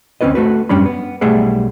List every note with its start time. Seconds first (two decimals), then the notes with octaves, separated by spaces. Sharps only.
0.21 D2 C4 C#4 F4 B4 D#5
0.35 A3 F#4 B4
0.69 F#2 G3 C#4 D4 B5
0.86 B3
1.21 B1 G3 A3 G#4 E5 F#5